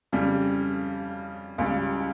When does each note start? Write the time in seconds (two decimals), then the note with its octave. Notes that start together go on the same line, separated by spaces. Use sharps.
0.12 F2 C#3 G3
1.58 C#2 C#3 G3